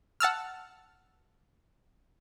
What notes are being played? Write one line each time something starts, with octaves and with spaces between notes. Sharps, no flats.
F#5 A5 E6 F6